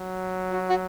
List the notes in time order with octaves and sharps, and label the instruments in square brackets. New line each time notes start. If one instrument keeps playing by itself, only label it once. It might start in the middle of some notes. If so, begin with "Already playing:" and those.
Already playing: [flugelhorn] F#3
[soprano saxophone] F#4
F#4